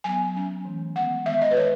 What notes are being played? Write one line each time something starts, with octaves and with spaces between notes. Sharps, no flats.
F#3 B3 G#5
F#3 C#4
E3 A3 C#4
D#3 G#3 B3 F#5
D#3 G#3 B3 E5
D#5
B4
D#3 G#3 C#5